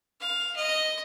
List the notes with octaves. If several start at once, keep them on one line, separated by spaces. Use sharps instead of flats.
F5
D#5